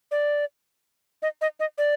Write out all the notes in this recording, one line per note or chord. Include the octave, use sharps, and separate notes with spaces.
D5
D#5
D#5
D#5
D5